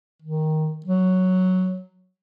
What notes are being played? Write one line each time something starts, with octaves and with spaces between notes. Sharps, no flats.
D#3
F#3